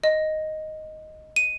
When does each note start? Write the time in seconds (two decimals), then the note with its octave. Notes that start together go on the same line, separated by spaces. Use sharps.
0.04 D#5
1.36 D#7